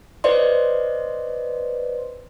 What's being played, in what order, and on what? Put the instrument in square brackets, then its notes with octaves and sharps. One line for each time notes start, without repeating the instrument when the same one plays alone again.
[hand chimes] B4 C5 D5 D#5 C6